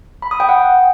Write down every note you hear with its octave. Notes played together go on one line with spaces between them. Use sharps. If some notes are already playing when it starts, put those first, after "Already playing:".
B5
D#6
G5
F#5